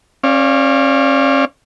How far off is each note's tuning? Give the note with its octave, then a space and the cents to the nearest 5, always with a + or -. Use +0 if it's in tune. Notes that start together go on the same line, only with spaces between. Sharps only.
C#4 -35 D5 +0 F5 -10